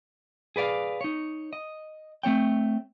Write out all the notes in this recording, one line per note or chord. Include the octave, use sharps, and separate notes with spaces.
G#4 B4 D5 F5
D#4 C#5
D#5
A3 C4 C#5 G5